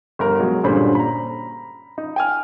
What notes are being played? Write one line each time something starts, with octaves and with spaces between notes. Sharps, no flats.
G1 A#4
B2 F#3 G#3
G2 A#2 D3 C#4 C5 B5
A#5 B5
D#4
G5 G#5 F6